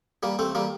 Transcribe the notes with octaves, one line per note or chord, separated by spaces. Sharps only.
G3 A#3
A3 C4
G3 A#3